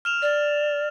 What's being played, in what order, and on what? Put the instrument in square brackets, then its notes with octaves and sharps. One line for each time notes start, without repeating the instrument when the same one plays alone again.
[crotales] F6 E7 F7
[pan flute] D5